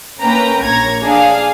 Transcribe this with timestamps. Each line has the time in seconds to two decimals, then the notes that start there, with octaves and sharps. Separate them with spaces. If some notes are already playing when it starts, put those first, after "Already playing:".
0.21 A#3 C#4 B4 G5 A#5
0.63 A#1 A#3 C#5 A#5 G#6 A#6
1.03 D4 G#4 F5